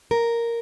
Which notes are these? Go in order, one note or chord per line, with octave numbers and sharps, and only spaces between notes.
A#4